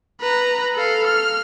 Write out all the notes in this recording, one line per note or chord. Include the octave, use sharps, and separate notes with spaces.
B4 A#5
A4 F5
F6